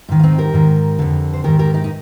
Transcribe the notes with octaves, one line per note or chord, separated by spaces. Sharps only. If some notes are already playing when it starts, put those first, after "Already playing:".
G#2 D#3
F4
C4 D#4
G4 A#4
G#2 D#3
F2 D3
C5
G#2 D#3 G4 A#4
G4 A#4
D#4 G4
D#4